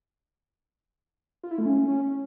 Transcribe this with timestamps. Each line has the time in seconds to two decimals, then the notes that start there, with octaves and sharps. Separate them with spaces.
1.44 F4
1.51 E4
1.58 A3
1.66 C#4